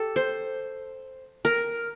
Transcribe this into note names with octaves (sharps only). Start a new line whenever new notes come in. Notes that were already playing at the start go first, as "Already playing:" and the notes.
Already playing: G4 A4
C5
A#4